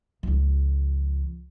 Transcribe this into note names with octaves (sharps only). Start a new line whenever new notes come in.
C#2 F3